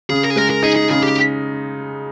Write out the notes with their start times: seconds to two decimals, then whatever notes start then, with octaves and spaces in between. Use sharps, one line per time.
0.10 C#3 G#4
0.23 A#4
0.30 G#4
0.36 G#3 A#4
0.50 A#4
0.63 D#4 G#4
0.76 G#4
0.90 C#3 G#4
1.03 G4